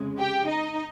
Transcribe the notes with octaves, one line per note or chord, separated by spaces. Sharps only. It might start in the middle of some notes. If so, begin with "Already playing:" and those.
Already playing: F2 C#3 G#3
G4 G5
D#4 D#5